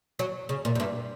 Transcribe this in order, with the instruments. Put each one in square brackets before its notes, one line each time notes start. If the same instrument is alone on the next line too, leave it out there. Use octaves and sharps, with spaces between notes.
[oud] F#3
C#3
A#2
F#2
G2